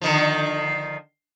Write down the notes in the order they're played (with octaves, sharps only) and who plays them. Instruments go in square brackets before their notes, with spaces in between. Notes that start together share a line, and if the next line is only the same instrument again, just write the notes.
[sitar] D3 D#3 F3